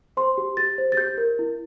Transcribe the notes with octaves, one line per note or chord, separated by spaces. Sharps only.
C5 C6
G4
G4 A6
C5
A6
G4 G6
A#4
E4